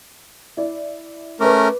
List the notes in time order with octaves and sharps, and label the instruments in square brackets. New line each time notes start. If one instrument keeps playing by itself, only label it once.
[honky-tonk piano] E4 D5
[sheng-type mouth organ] A3 C#4 A#4 [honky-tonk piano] B4 D6